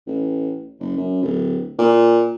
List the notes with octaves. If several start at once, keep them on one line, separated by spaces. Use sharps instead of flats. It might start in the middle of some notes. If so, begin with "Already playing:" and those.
A1
F#1
F#2
D1
A#2